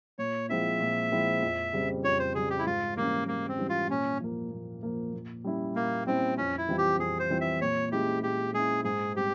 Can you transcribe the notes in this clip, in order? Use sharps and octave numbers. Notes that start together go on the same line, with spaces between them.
A#2 C#5
F3 G#3 C4 E4 E5
A#2
F3 G#3 C4 E4
F2
C#3 G3 C4
F2 C#5
C5
C#3 G3 C4 G#4
G4
E4
G#2 F4
E3 G3 A#3 C#4
G#2 A#3
C4
E3 G3 C#4
F4
A#2 C#4
F3 A#3
A#2
F3 A#3
A#2
G3 C#4 E4
A#2 A#3
G3 C4 C#4 E4
F2 C#4
E4
E3 G3 C4 F4
G4
F2 G#4
C5
E3 G3 C4 F4
E5
A#2 C#5
G#3 C#4 E4 G4
A#2 G4
G#3 C#4 E4 G#4
G#2 G#4
G3 C4 G4